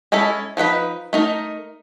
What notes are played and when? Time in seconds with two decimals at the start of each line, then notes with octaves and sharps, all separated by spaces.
0.12 G#3 C#4 E4 A4 B5
0.57 F3 D#4 B4 B5
1.13 A3 D#4 A#4